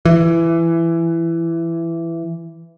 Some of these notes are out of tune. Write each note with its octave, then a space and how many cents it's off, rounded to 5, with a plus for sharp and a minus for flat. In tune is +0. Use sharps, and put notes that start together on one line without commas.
E3 +15